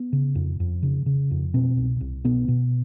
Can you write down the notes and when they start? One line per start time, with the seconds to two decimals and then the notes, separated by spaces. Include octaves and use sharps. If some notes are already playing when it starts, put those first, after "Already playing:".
Already playing: B3
0.13 C#3
0.35 F2
0.60 F2
0.83 C#3
1.06 C#3
1.31 F2
1.54 B2 C4
1.77 C2
2.01 C2
2.24 B2 B3
2.48 B2